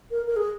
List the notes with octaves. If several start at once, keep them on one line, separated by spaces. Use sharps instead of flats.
A#4
A#4
G#4